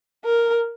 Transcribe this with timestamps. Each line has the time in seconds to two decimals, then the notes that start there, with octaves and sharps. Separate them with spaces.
0.25 A#4